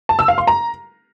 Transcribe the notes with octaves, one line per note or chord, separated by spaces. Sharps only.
A5
E6
F5
C6
A#5